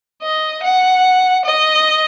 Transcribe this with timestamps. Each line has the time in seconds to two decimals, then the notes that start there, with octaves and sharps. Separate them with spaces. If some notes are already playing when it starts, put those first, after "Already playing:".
0.22 D#5
0.63 F#5
1.46 D#5